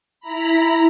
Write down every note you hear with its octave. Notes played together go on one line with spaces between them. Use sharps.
E4 A#5 B5